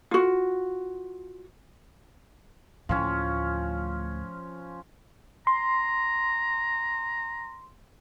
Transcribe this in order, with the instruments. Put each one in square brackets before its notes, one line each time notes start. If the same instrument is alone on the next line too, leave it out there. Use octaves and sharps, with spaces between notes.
[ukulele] F4 F#4
[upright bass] D2 A2 [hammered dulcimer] F3 C#4
[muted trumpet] A#5 [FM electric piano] C6